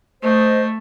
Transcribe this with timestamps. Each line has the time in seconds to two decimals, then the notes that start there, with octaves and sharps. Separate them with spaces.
0.22 A3 C5 D#5